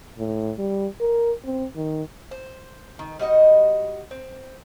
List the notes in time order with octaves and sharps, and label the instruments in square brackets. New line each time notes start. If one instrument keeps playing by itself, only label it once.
[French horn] A2
G3
A#4
C4
D#3
[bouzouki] C5
D#3
G3 D#4 F#4 D#5
C4